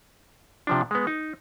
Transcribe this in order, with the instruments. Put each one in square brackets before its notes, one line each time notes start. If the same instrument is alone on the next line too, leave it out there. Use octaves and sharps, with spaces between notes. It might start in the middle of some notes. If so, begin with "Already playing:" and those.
[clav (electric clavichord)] C3 F3 D4
G#3 B3
D#4